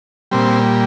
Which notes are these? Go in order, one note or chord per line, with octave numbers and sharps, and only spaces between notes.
A#2 G3 C4